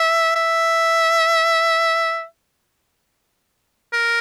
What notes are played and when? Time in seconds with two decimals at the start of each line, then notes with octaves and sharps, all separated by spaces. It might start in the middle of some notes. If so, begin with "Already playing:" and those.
Already playing: E5
0.36 E5
3.93 A#4